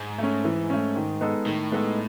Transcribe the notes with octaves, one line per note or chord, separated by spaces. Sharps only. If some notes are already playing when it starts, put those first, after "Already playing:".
Already playing: G#2
A3 C#4
E3
A3 C#4
D#3
G#3 B3 D#4 A4
A2 D#3
G#3 B3 D#4 A4